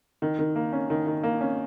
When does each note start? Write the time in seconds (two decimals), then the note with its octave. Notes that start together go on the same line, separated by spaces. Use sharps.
0.22 D#3
0.39 D#3
0.56 A#3
0.73 C#4
0.90 D#3
1.07 D#3
1.23 A#3
1.41 C#4